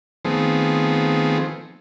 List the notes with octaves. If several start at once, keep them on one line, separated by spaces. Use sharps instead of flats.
D#3 F3 A3 B3 C4 G#4